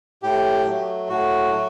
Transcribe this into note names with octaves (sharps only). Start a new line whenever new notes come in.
A2 G4
F#3 A3
A2 F#4
F#3 A3